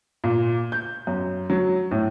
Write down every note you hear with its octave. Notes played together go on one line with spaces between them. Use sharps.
A#2
G6
F#2
F#3
A2